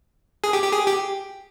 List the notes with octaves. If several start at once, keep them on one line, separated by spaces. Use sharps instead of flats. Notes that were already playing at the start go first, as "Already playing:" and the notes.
G#4
G4
G4
G#4
G4